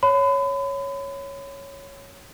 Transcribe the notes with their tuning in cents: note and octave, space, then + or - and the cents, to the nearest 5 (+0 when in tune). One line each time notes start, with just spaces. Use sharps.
C#5 +0 B5 +35